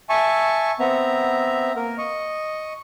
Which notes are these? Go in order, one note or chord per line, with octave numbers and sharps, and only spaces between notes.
E5 G#5 A5 C#6
B3 C4 E5 A#5
A#3 A#4
D#5 C#6